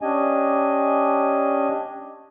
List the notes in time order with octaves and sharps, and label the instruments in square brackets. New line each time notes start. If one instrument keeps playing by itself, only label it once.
[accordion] C#4 D4 G4 D#5 G#5